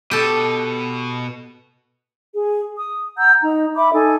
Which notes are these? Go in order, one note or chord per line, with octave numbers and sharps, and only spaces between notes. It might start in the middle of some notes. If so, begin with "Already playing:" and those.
B2 G4 A4
G#4
D#6
F#5 A#5 E6 G6
D#4 A#5
E5 B5 D6
D#4 A4 G#5